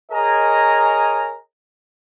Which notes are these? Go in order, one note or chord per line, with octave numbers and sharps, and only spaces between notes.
G#4 A#4 C#5 D#5 G#5 A#5